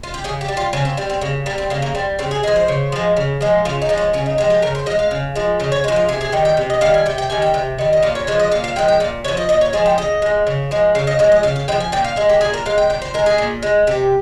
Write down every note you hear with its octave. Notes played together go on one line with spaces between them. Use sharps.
F4
G4
C#3 G#4
G4
G3
F4
C#3 C#4
C4
G3 C4
C4
C#3 A#3
G3 A#3
C4
C#3 A#3
A#3
G3 C4
C#3 C4
G#4
F3 G#3 G#4
C5
C#3
F3 G#3
C#3
F3 G#3
C#3 F4
D#4
F3 G#3
C#4
C#3 C#4
D#4
F3 G#3 G4
G4
C#3 A#4
C5
F3 D#5
G#3
F5
C#3
F3 G#3
C#3 D#5
C#5
F3 G#3 C5
F4
C3 G#4
G#4
D#3 G3 G5
G5
C3
D#5
D#3 G3 F5
G#5
C3 G5
G5
D#3 G3 G#5
G5
C3
D#3 G3
D#5
A#2 F5
C#5
F3 G#3 C#5
D#5
A#2 F5
F5
F3 G#3 G5
G5
A#2 F5
G#3 C#5
F3
D#5
A#2 D#5
C#5
F3 G#3 G#4
G5
C#3 D#5
F3 G#3
C#3
F3 G#3
C#3 F5
D#5
F3 G#3 C#5
D#5
C#3 F5
F5
G#3 G5
F3
G#5
A#2 G5
F5
G#3 G#4
G4
A#2 G#4
A#4
G#3 F5
G5
A#2 G5
C5
G#3 A#4
G#4
A#2
G#3
C3 G4